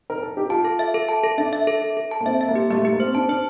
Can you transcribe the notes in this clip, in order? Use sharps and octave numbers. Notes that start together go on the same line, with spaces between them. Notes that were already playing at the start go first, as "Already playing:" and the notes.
A#4
A4
G4
F4 A5
A4
E5
A4
A5
A4
D4 E5
E5
A4
A4
A4
A5
A#3
C4 E5
E5
A#3
G4
A3 G4
A3
G4
A#3
C4 C5
D4 A5
D4 C5